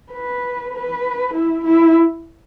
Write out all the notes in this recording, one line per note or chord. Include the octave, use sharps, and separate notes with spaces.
B4
B4
E4
E4